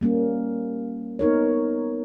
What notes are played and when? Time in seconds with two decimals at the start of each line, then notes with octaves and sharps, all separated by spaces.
0.01 G3 A#3 C#4
1.19 B3 D#4 A#4 C#5